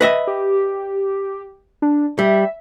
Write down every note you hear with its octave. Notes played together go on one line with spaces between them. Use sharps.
B4 D#5 E5
G4
D4
G3 E5